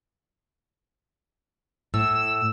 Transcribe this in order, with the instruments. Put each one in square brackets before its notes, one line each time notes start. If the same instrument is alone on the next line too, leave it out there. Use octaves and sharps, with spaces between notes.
[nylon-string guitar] A2 [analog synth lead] E6